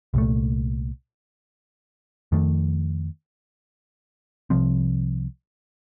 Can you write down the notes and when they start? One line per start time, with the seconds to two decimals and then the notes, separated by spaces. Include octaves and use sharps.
0.14 C2 A#2 A3
2.32 F2 D#3 A3
4.50 C2 C3 F3 C4